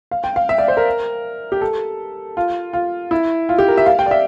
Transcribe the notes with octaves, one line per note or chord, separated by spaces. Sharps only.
F5
G5
F5
E5
D5
C5
A#4
G4
A4
F4
F4
E4
F4
G4
A#4
E5
F5
G5
D5
E5